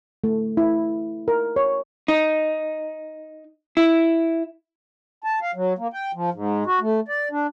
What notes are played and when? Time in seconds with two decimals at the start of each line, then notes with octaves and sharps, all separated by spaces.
0.24 A3
0.57 E4
1.28 A#4
1.56 C#5
2.08 D#4
3.77 E4
5.24 A5
5.42 F5
5.55 F#3
5.78 A#3
5.93 G5
6.15 F3
6.33 G#2
6.66 F#4
6.81 A3
7.08 D5
7.31 D4